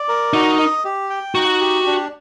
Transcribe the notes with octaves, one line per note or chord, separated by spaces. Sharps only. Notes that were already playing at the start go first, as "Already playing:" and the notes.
Already playing: D5
A#4
D#4 F#4
D#5
G4
G5
D#4 F#4
G4
D4